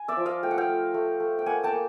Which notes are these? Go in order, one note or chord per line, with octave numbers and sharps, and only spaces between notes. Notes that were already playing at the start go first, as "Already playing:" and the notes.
Already playing: G#5
D5 E5
F3
D#5 F5
A3 G5
F#5
F5 G5
A3
A3
A3
G5
A#3 F#5 G#5
G5 A5
A#3